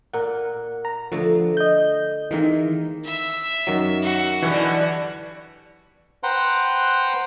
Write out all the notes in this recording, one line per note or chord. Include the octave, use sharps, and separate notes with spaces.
A#2 A#4 F#5
A#5
D3 F3 A3 B3
D#5 G6
D#3 E3 G#3 A#3 C4
E5
F#2 D#3 F#3
F#4 C#7
B2 D3 E3 G3
B4 C5 F#5 G5 A#5 C6